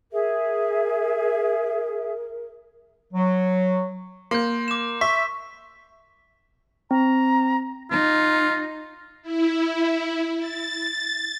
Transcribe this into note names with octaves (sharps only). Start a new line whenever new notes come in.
G#4 A#4 E5
F#3
A#3 C6 G6
D6 E7
E5 C#6 B6
C4 A#5
D#4 F4
E4
A6